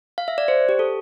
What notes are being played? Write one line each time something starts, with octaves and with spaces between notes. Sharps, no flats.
F5
E5
D5
C5
G4
A4